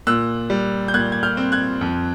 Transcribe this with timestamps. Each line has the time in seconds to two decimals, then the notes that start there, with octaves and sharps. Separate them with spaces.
0.07 A#2 E6 F#6
0.50 G3
0.88 G6
0.94 A#2 F#6 G#6
1.12 G#6
1.23 F6 G6
1.37 C4
1.52 F#6 G#6
1.81 F2